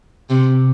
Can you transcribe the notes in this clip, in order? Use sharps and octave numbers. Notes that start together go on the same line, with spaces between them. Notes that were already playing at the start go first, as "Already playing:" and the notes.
C3